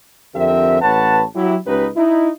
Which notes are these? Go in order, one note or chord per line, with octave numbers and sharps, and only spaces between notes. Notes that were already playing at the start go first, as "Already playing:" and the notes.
F2 D3 C4 G4 A#4 E5
A1 B4 C#5 F#5 A5
F#3 E4 G4
C#2 C#3 D#4 G4 B4
D#4 E4